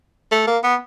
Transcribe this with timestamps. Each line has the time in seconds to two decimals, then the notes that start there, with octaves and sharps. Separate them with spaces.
0.31 A3
0.47 A#3
0.64 B3